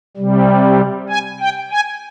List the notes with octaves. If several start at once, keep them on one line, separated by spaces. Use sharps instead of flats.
C3 G3
G#5
G5
G#5